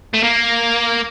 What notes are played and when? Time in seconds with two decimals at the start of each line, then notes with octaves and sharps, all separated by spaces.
0.14 A3
0.23 A#3